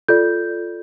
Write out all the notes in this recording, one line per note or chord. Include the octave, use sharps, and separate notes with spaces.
F4 A4 D5 G6